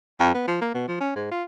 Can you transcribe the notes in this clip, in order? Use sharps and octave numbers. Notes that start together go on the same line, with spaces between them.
F2
B3
F3
A#3
B2
F3
C#4
G#2
F4